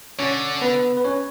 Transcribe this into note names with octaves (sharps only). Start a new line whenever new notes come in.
D3 C#4 C#5
B3 B4
B4
C#4 C#5